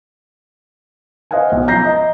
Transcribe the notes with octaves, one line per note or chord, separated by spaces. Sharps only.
C5 D#5 F5 F#5 G#5
B1
F3 A#5 G6 A#6 C7
D#5 A#5